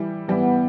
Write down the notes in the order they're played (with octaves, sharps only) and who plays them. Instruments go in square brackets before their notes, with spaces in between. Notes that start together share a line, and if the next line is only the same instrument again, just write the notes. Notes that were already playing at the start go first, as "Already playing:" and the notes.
Already playing: [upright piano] E3 G3 E4
[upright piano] E3 G3 E4 [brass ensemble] B3